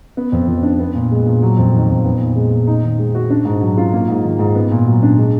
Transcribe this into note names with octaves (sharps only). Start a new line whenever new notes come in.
B3
F2
F3
D4
B3
A#2
G#3
A#2
F#3
F2
D#3
F2
B3
A#2
G#3
A#2
D#4
D#3
G#3
F#4
D4
G#2
F#3
F4
A#3
G#2
D#3
G#2
B3
A#2
F#3
D4
G#3